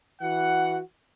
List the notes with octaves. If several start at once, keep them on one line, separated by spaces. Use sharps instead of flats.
E3 F#4 F#5